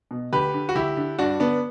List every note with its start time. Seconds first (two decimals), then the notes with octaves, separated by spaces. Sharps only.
0.11 B2
0.33 D2 G4 B4
0.54 D3
0.69 F#4
0.75 D2 E4 G4
0.97 D3
1.19 G2 D4 F#4
1.40 D3 B3 D4